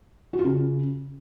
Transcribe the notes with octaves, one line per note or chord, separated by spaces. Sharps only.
F#4
F4
C#3